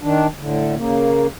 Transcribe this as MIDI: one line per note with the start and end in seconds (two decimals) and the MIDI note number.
0.01 0.27 51
0.01 0.27 62
0.39 0.75 45
0.39 0.75 50
0.76 1.27 49
0.76 1.27 58